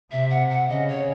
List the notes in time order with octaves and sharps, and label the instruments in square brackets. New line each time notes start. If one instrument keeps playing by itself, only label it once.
[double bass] C3 [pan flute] E5
[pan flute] F#5
F#5
[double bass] C#3 [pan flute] D#5
[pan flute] C#5